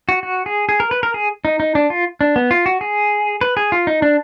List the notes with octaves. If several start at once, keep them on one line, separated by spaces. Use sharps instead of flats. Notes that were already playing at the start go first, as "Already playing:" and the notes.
F#4
F#4
G#4
G#4
A#4
B4
A#4
G#4
D#4
D#4
D4
F4
D4
B3
F4
F#4
G#4
B4
G#4
F4
D#4
D4